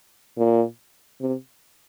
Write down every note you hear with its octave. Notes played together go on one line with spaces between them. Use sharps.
A#2
C3